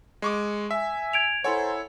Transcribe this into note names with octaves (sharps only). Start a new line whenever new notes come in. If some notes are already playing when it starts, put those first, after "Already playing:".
G#3 C#6 D6
E5 G#5
G#6 D7 F7
E4 A4 A#4 C5 C#5 F#5 G#5 C6